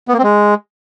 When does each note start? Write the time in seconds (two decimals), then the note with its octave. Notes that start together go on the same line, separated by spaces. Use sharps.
0.08 B3
0.13 A#3
0.19 C4
0.24 G#3